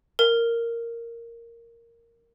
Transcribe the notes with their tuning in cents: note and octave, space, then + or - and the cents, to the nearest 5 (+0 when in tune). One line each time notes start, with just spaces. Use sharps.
A#4 -5